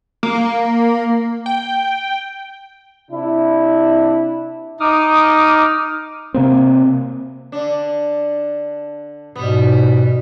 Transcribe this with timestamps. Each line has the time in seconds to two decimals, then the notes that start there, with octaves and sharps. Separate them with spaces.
0.23 A#3
1.46 G5
3.11 C3 D4 E4
4.80 D#4 D6 D#6 F6
6.34 C3 A#3 C4
7.52 D3 D4
9.36 G#2 B2 G3 B3